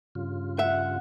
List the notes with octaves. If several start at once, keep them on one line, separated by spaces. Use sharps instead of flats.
G2 C#3 F4
E5 F#5